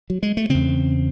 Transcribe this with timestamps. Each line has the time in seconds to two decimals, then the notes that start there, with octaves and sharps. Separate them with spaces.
0.10 F#3
0.23 G#3
0.37 A3
0.49 E2 C#3 C4